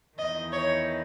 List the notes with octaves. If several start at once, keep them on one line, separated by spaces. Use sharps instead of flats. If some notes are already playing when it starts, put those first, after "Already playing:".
E2 D#3 D#5
C#5